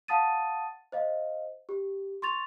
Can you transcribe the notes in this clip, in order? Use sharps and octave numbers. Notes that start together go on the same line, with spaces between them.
F5 F#5 A5 D#6 A6 D#7
C5 D#5 F5
G4
C6 C#6 A6 F7